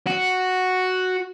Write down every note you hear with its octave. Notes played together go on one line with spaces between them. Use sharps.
F#4